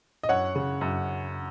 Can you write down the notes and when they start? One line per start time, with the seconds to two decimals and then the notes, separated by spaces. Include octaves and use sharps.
0.23 D#5
0.29 F#2 C#5 F#5
0.55 C#3
0.81 F#2